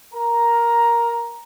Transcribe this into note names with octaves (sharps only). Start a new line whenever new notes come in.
A#4 A#5